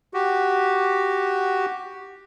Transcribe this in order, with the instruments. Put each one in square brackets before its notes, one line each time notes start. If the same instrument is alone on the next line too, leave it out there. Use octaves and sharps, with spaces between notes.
[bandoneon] F#4 G4